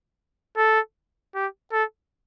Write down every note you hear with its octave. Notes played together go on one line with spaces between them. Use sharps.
A4
G4
A4